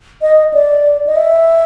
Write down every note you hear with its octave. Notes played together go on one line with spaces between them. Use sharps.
D#5
D5
D#5
E5